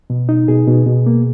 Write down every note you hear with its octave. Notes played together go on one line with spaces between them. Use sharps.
B2
D#4
B2 G#4
B2
B2
A#3